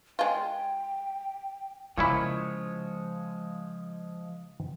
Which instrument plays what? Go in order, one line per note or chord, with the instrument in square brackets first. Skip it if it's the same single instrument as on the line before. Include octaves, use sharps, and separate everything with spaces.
[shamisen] G#3 F4 [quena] G5
[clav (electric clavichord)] A#2 C#4 E4 [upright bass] C#3 [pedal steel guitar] F3 G#3 C#5